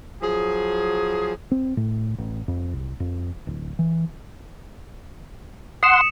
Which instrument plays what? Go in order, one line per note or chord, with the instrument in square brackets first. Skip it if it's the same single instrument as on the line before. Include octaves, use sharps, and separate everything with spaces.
[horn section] F3 F#3 G#4
[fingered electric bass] C4
A2
A1
F2
C2
F2
D1
E3
[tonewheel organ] F#5 C6 [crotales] D#6 C#7 E7